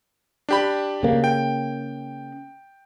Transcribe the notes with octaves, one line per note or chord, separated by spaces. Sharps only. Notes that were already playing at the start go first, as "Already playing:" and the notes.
D4 G4 B5
C#3 A#3
G5